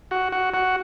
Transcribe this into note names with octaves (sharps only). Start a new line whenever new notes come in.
F#4
F#4
F#4